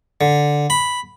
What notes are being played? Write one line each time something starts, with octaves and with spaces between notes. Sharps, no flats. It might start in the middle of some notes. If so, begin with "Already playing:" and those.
D3
B5